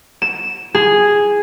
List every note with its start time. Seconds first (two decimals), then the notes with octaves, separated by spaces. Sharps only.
0.22 E7
0.75 G#4